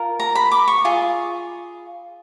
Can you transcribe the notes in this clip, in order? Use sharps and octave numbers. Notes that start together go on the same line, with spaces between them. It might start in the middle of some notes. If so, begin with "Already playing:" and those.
Already playing: F4 A#4
A#5
B5
D6
C#6
F4 G#4